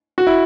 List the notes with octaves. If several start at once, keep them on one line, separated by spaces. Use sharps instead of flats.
F#4
E4